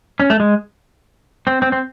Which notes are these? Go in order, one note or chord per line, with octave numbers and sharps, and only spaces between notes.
C#4
A3
G#3
C4
C4
C4